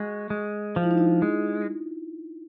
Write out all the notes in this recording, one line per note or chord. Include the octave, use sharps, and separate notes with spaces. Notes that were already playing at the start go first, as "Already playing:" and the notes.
Already playing: G#3 F#4
G#3
F3 F4
E4
D#4
D4 E4
G#3